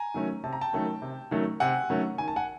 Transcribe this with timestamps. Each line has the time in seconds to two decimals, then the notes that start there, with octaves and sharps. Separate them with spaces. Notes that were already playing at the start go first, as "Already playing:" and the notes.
Already playing: G#5 A#5
0.14 D#3 F#3 A3 C#4
0.44 C3 A5
0.53 A#5
0.61 G5 A5
0.73 D#3 F#3 A3 C#4
1.02 C3
1.31 D#3 F#3 A3 C#4
1.60 C3 F#5 G#5
1.90 D#3 F#3 A3 C#4
2.18 D#3 G#5
2.28 A5
2.36 F#5 G#5